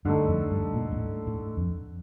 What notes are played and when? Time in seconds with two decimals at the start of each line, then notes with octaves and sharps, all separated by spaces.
0.05 G2 D3 A3 D#4 A4
0.28 F2
0.51 G2
0.73 A#2
0.92 G2
0.96 A2
1.27 A2
1.57 F2